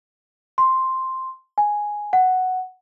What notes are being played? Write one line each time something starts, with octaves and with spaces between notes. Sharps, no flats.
C6
G#5
F#5